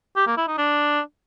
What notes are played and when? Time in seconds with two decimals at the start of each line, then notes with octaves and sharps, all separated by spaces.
0.16 G4
0.27 A#3
0.37 E4
0.48 D#4
0.58 D4